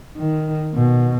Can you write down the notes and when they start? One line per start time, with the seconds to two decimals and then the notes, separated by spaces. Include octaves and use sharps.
0.17 D#3
0.75 B2